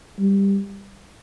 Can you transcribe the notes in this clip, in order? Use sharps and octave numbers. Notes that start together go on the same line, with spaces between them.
G3